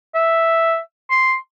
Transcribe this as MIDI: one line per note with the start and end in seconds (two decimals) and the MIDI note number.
0.15 0.78 76
1.10 1.35 84